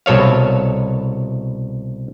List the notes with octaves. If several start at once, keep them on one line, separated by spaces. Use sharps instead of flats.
C2 B2 A4 C#5 F5